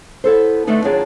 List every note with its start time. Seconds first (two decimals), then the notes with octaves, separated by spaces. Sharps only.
0.24 B3 E4 A4 C5
0.67 D3 A3 B3 D4 D#4
0.84 D#2 F#3 D4 F4 G#4